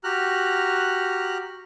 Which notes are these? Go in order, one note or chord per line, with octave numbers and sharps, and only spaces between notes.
F#4 G4 A#5 F6 F#6